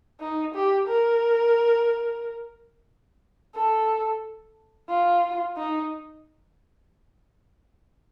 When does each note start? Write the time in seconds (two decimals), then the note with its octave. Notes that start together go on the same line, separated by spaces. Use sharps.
0.20 D#4
0.55 G4
0.88 A#4
3.55 A4
4.89 F4
5.56 D#4